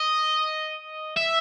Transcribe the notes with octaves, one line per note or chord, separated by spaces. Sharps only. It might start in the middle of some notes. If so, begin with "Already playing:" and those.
Already playing: D#5
E5